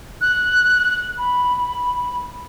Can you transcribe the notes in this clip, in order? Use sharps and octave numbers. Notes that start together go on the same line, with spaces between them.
F#6
B5